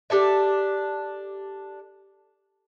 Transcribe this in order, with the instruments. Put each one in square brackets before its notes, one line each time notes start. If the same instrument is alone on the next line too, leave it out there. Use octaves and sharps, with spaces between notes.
[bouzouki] D4 G4 A4 E5